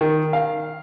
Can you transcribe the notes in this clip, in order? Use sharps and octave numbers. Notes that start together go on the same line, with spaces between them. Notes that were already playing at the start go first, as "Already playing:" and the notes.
D#3
F5